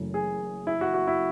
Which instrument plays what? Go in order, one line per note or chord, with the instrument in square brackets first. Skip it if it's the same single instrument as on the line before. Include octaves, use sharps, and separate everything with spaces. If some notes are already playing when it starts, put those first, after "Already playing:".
Already playing: [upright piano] F#1 F#2 E3 A3
[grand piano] G#4
E4
F#4
F#4
E4